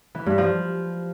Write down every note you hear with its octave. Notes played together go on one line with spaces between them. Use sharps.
E3
G2
F3